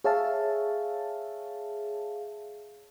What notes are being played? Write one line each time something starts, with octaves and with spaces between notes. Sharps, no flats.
G#4 C#5 E5 F5 A5